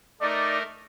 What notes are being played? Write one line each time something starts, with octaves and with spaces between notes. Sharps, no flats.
A3 D#4 A#4 D5